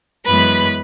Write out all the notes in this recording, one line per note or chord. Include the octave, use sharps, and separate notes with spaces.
F#2 E3 G#3 B3 B4 B5